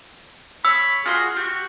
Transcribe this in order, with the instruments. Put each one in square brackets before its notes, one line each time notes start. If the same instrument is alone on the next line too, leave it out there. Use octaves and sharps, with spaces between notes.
[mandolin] C#5 [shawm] B5 [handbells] E6
[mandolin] F4 F#4 C6 [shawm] G#4
[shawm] F#4 [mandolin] G4